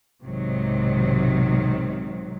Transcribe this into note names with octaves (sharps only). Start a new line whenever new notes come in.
B1 G#2 C3 D#3 F#3